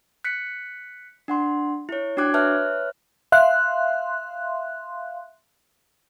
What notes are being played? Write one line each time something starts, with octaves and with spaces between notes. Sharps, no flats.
F#6 B6 C#7
D4 F#5 C6
E4 C#5
D4 F#4 G5 D6 F#6 G#6
B4 C#5 E5 A5 F6 F#6
E5 F5 C6 F#6